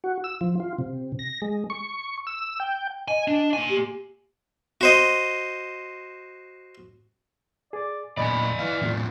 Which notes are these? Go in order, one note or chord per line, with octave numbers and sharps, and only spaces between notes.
F#4
E6
F3
F4
C3
A#6
G#3
C#6
E6
G5
D#5 G#5
D4
A#3 G#5
G4
F#4 C5 D#5
G#4 D5
E2 A#2 D5 D#5 G#5 B5
E3 E4 F5
E2 A2 C3 F4